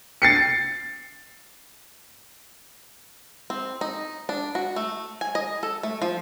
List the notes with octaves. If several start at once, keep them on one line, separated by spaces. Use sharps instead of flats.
A6 C7 C#7
C4
D#4
D4
F#4
A3
G#5
D#5
A4
A3
F3